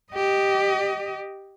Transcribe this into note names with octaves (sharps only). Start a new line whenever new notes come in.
G4 D#5